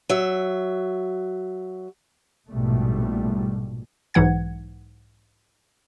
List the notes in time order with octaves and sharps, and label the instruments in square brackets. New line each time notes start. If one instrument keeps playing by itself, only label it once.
[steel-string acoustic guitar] F#3 E5
[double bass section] A#1 G#2 B2 G3 A3
[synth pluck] B1 G#2 E3 F#5 G#6